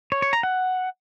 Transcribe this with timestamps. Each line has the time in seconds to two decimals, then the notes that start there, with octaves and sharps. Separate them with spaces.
0.12 C#5
0.22 C#5
0.33 A#5
0.43 F#5